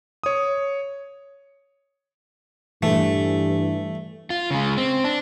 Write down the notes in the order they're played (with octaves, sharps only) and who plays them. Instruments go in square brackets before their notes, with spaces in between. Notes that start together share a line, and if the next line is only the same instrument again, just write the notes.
[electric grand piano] C#5 D#6
[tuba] G2 [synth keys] E3 [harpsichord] A3
[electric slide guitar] F4
C#3 G#3
C4
D4